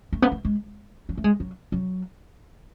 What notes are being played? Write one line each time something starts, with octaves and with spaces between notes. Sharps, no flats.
A3
B3
A3
G#3
F#3
A3
G#3
F#3
F#3